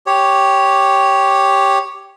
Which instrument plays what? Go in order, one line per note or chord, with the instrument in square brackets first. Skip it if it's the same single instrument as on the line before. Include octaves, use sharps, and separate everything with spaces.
[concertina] G4 C#5